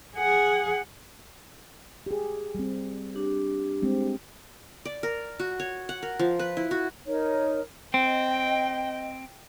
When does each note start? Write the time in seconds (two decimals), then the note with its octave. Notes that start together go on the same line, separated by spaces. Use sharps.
0.16 G#4 F#5
2.06 G4 G#4
2.55 G3 C4
3.14 D4 G4
3.82 G3 G#3 C4
4.85 D5
5.03 A#4
5.39 F#4
5.60 C#5
5.89 F#5
6.03 A#4
6.19 F3
6.39 B4
6.57 E4
6.71 F#4
7.07 D#4 A#4 C#5
7.94 C4 D#5 G5